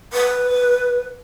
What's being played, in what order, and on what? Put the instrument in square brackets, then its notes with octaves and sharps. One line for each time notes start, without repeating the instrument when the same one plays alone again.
[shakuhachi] B4